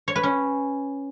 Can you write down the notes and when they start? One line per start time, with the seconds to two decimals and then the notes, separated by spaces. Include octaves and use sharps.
0.08 C#5
0.16 B4
0.23 C#4